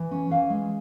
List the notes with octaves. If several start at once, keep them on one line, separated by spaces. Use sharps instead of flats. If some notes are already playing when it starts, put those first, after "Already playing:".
Already playing: E3
C#4
E3 F5
G#3